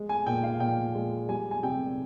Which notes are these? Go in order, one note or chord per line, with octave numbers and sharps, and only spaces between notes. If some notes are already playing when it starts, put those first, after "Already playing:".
Already playing: G#3
G#5
A#2 G5
F5
A#2 G5
G#3
G3 G#5
G#5
C3 G5